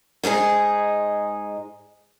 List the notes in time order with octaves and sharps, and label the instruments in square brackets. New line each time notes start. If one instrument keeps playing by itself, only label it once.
[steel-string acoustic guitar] G#2 G#3 D#4 G#4